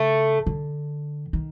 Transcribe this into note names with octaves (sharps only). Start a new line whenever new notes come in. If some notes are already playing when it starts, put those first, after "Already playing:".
Already playing: C#3 A3
D3
D#3